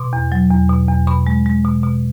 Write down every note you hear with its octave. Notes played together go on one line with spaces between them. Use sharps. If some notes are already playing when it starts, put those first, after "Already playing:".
Already playing: B2 C6 D6
E2
F#3
E2
B2
E2
B2 B5 C#6
G#3
G#3
B2
B2